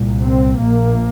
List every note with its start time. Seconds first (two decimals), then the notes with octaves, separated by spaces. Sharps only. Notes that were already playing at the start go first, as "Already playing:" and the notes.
Already playing: C2 A#2
0.23 C4
0.60 A#1 A#2 A#3